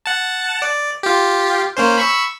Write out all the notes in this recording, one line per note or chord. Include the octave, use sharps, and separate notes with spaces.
F#5 A5
D5
F4 G4
A#3 C#4 C5
B5 C#6 E6